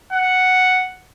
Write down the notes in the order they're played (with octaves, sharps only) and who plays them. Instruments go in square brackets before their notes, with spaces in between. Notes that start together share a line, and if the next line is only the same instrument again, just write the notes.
[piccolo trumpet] F#5